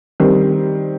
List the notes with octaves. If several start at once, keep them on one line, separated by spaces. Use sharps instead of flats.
D#3 G3 C4